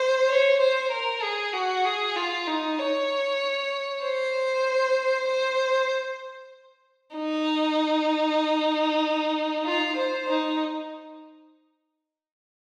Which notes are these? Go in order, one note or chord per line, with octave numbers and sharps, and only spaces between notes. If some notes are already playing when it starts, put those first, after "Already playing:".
Already playing: C5
C#5
C5
A#4
G#4
F#4
G#4
F4
D#4
C#5
C5
C5
D#4
F4
C5
D#4